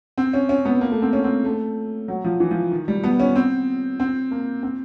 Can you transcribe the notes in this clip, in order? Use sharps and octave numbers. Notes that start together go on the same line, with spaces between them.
C4
C#4
C#4
B3
A#3
A3
C4
C#4
C4
A3
F#3
F3
E3
F3
D#3
G3
B3
C#4
C4
C4
A#3
C4